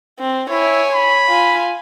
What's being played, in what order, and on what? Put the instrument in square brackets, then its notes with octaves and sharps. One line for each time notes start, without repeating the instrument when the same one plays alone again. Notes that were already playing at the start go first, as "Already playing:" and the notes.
[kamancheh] C4
[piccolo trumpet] E4 [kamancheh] C#5 G#5
[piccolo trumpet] B5
[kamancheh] F4 G#5